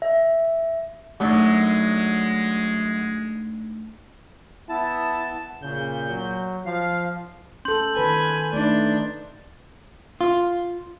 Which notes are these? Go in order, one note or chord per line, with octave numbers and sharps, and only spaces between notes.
E5
F#2 G#3 A3 D4 D#4
B3 E4 A5
A#2 C#3 G6
F#3
F3 F5
C#4 A4 C6 G6 F#7
D#3 B4 G#5 B5
A3 D4 D#4
F4